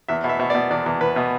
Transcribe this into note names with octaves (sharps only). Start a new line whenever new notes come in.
E2 E5
B2
E5
B2
D5
B2
E2 D5
E2
E2 B4
B2